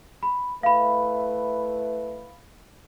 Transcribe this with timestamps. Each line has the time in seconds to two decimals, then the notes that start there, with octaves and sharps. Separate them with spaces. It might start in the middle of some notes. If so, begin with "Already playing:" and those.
0.23 B5
0.63 A3 E4 B4 F5 B5